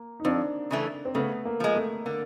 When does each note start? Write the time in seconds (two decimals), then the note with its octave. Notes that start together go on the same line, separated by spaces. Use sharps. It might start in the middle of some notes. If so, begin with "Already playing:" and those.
Already playing: A#3
0.20 D#4
0.25 F2 C4 D4
0.71 C#3 E3 A3
1.05 C4
1.15 C#3 A3 B3
1.45 A#3
1.60 F3 G#3
1.75 A3
2.06 D3 A#3